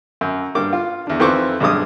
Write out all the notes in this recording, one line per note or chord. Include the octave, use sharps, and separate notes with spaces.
F#2
G2 A#3 D6
F4
E2 D4
F2 D#3 E3 C5 C#6 D6
B1 G2 G#3 D6 D#6